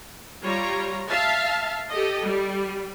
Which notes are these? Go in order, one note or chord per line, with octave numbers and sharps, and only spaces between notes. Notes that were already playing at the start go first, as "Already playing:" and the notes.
G3 F4 C#5 A#5
E5 F5 A5
G4 A4 D#5
G3